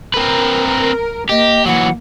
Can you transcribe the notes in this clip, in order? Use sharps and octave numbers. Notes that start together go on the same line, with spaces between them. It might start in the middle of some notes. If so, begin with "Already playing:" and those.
C4 A#4 B4
A#3 G4 D#5
E3 F#3 F#5